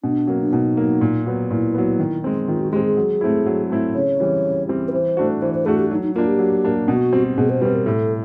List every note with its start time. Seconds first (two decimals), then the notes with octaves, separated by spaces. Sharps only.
0.04 B2 D4
0.27 F#3 A#3 C#4
0.41 D4
0.53 B2 D#4
0.77 F#3 A#3
1.01 A#2
1.26 F#3 B3
1.51 A#2 E4
1.74 F#3 B3
1.99 D#3
2.24 G#3 C4
2.48 D#3 F4
2.60 F#4
2.72 G#3 C4 G4
2.85 G#4
2.97 F#3
3.21 A3 C4 E4
3.46 F#3
3.70 A3 C4 E4
3.94 C#3 C#5
4.20 E3 G3 C4
4.44 C#3
4.68 E3 G3 C4
4.88 B4
4.93 E3 C5
5.17 A3 D4 F#4
5.41 E3 C5
5.54 C5
5.66 A3 D4 F#4 G#4
5.79 G4
5.91 F#3 D#4
6.03 D#4
6.15 A#3 D4 F4
6.27 G4
6.39 F#3
6.65 A#3 D4
6.88 B2 F#4
7.13 G3 C4
7.37 B2 G#4
7.50 C5
7.61 G3 C4 B4
7.75 A#4
7.86 A2 A4